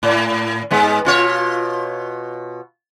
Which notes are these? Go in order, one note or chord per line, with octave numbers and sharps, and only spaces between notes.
A2
G#2 G#3 B3
B2 F4 C#5